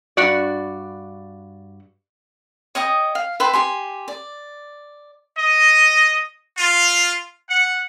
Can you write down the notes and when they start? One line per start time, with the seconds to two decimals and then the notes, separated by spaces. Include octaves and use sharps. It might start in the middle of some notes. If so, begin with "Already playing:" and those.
0.17 G2 F#4 D5
2.75 C#5 D#5 G5 D#6
3.15 F5
3.40 B4 E5 G5 C6
3.53 G4 G#5 C6
4.08 D5
5.38 D#5
6.57 F4
7.50 F#5